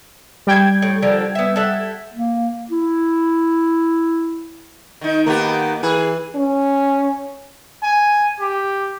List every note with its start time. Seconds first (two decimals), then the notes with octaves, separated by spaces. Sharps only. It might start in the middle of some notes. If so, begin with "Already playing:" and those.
0.47 G3 G5 G#6
0.82 A2
1.02 D3 F3 A#3
1.35 B3 E5
1.56 A4 E5 F#5
2.14 A#3
2.71 E4
5.01 D#3 D#4
5.27 D#3 A#3 B3 G4
5.83 E3 G#4
6.35 C#4
7.83 G#5
8.40 G4